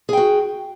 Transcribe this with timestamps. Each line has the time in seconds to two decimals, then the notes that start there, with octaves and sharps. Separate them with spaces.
0.09 G#4
0.13 G5
0.17 F#4